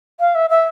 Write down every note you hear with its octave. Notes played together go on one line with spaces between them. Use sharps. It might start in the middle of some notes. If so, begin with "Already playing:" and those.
F5
E5
E5